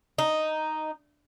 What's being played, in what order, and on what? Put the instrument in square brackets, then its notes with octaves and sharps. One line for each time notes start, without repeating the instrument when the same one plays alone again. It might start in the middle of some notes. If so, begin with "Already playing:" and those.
[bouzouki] D#4